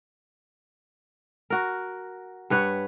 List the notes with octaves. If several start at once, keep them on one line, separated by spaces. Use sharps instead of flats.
F#4 A#4
G2 B4 C#5 F#5